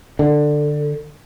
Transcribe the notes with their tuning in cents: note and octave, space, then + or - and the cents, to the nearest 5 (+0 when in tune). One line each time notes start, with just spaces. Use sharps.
D3 +15